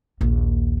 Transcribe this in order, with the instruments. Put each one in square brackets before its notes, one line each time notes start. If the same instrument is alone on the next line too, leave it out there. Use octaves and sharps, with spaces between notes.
[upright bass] A#1 D#2